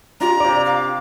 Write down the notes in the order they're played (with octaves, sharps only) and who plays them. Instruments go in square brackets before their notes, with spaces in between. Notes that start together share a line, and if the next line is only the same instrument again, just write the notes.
[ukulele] D4 F4 G4 [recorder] A#5
[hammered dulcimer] C3 D6 [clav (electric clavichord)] D5
[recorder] F5